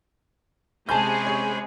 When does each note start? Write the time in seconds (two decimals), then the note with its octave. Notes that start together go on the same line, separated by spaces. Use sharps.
0.89 C3 G#3 C#4 G#4 C5 A5 B5 G6
1.27 C#5